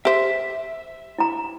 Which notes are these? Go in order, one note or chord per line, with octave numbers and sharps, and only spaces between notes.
G4 C5 E5
E4 A#5